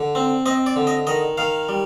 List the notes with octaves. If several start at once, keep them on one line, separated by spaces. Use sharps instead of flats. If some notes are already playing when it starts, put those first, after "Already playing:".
Already playing: D3
C4
C4 D#5
D5
D3
D#5
D#3 D#5
D#3 F5
G3